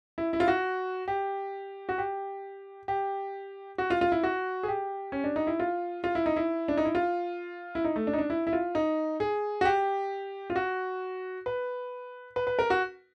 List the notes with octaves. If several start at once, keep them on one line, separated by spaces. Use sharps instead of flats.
E4
E4
F4
F#4
G4
F#4
G4
G4
F#4
F4
F4
E4
F#4
G#4
G4
C#4
D4
D#4
E4
F4
F4
E4
D#4
E4
D4
D#4
E4
F4
E4
D#4
A3
D4
D#4
D4
E4
E4
F4
D#4
G#4
F#4
G4
F4
F#4
B4
B4
B4
A#4
F#4